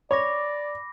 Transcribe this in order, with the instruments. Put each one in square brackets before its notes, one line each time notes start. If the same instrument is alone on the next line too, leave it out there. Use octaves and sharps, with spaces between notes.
[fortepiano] C#5 [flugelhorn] D5 [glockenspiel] B5 D6 A#6